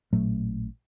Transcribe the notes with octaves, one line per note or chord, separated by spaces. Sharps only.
A1 A#2 F#3 A3